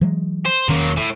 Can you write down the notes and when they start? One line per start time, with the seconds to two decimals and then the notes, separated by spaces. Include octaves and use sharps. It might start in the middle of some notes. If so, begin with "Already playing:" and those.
0.01 E3 F#3 G#3
0.46 C5
0.68 E1 D#3 F#3 A#3 C#4
0.97 A2